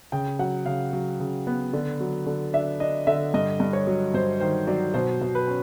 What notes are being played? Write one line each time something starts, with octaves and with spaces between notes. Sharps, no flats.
C#3 G5
F#3 F#5
C#3 F5
F#3
C#3
B3
D3
F#3
D3
D4 E5
D4 D#5
D3 E5
G2 D#5
G2
C#5
F#3
G2 C5
D#3 C5
F#3 D5
B2 C5
B2
B4
C#4